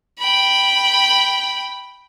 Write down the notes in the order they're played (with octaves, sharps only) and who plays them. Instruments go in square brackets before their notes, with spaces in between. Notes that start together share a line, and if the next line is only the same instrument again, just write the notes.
[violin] G5 B5